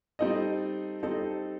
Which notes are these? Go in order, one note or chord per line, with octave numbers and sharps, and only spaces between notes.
G3 C4 D#4 A4 D#5
G3 C4 D#4 A4 D#5